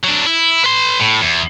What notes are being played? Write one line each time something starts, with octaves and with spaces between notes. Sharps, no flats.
F#3 D4
E4
B4 C6
A2
E2